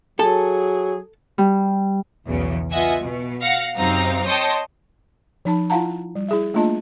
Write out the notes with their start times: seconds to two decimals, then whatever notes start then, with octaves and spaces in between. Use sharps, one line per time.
0.19 F#3 G#4 A4 A5
1.38 G3
2.27 B1 E2 C#3
2.71 B3 F4 D#5 E5 F#5 G#5
3.02 B2
3.42 F5 F#5 A#6 C#7
3.77 F#2 C3 C4 D#4 F5 A#5
4.26 C#5 D#5 G5 A5 C6 D#6
5.45 F3 D#4 A5 B5
5.70 E4 F4 F5 F#5 A5 A#5
6.15 G3
6.28 E4 G#4 E5
6.54 A3 A#3 D4 F4 D#5 A5